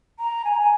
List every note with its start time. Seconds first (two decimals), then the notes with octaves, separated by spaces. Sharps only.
0.19 A#5
0.45 G#5
0.52 A#5
0.60 G#5